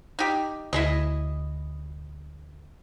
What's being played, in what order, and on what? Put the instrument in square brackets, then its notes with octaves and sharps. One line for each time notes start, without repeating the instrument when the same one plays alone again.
[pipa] D#4 G4
[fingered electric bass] D2 [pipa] E4 G#4 D#5